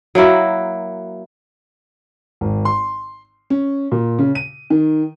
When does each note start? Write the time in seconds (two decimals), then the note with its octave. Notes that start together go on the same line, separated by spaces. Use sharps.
0.15 F#3 A#3 E4 F#4
2.41 G#1
2.65 C6
3.50 C#4
3.92 A#2
4.19 C#3
4.35 D#7
4.70 D#3